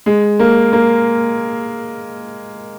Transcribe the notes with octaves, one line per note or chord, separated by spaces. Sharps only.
G#3
A#3
A#3